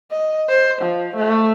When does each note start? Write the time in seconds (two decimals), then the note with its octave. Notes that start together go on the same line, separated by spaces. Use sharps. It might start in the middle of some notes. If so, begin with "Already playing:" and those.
0.11 D#5
0.49 C5
0.82 F3
1.16 A3